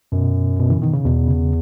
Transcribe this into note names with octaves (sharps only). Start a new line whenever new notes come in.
F#2 B2
B2
C#3 E3
B2 D#3
C#3
E2 B2
C#3